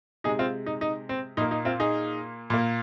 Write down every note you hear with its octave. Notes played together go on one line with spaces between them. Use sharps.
C3 G#3 D#4 G#4
C4 F4
D#4
D#4
C4
A#2 A#3 D#4
D#4
C4 F4
D#4 G#4
A#2 A#3